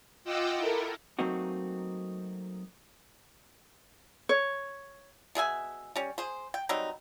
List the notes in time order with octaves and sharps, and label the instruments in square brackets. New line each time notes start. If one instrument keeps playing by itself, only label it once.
[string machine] F4 D#5 F#5 G5 D6 E6
E4 A4 A#4
[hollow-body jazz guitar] F#3 A3 A#3 C4 D#4 F#4
[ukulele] C#5
[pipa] B2 G#4 E5 G#5
G3 C#4
G#4 C5
G5
F#3 G3 C4 D#4